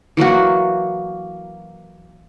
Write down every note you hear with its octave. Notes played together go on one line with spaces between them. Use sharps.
E3 F#3 A#3 F#4